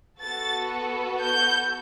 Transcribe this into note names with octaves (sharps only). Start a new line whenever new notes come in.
B3 F#4 A4 A6
G6